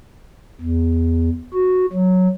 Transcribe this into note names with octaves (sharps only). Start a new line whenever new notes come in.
E2
F#4
F#3